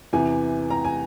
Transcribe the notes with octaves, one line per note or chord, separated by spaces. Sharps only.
E2 C3 E3 G#5
A#5
G#5